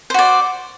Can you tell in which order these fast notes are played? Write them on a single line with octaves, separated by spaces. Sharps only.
C5 F#4 D5